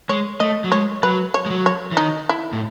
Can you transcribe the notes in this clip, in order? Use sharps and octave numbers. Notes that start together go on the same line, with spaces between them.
G#3 C#5
A3 D#5
F#3
G#3 C#5
F#3 B4
C#5
G#3
F#3
C#5
E3
D#3 D#4
E4
A2